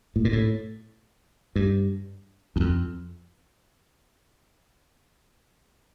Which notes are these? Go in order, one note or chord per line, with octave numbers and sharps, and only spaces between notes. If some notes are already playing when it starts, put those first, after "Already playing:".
A2
A#2
A2
G2
E2
F2